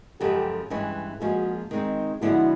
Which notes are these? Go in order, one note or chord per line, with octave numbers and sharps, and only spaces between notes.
F#2 C#3 F3 G#3 G4 A4
G2 E3 G#3 C#4
A#2 F3 G#3 C#4 F#4 G#4
D#3 G#3 C4 D#4
D3 F3 G#3 B3 D4 E4 F#4